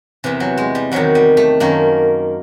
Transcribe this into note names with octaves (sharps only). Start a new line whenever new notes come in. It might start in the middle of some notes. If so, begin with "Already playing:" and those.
E2 C3 E3
F#3
G#3
G3
E2 C3 D#3 F#3
G3
A3
F#2 D#3 A#3